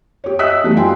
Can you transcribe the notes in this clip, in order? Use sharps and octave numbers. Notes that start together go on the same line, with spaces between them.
G4 C#5
D#5 E5 D#6 E6 F#6 B6
E3 G3 A3 D#4
G2 F3 F#3 G5 G#5 C6